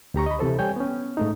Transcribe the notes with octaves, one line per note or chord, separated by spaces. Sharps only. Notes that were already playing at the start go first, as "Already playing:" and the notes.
D2 G4 A#5 C#6
D#5 B5
C3 E3 A4 C5
G3 C#5 G5 G#5 G6
B3 C#4
G#2 A3 D#4